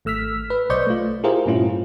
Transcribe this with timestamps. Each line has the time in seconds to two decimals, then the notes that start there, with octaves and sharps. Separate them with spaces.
0.05 G#1 A3 E6 F6 B6
0.50 B4
0.70 B1 C5 D5 D#5 C#6 G6
0.86 A3 F4
1.24 E4 F4 G4 G#4 A#4 C5
1.46 G2 A#2 A3 C#4 E4 F4